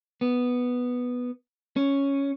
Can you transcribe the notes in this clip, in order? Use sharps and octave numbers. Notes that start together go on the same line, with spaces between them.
B3
C#4